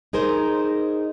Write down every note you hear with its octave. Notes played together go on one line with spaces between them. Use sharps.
D#4 G#4 A#4 C5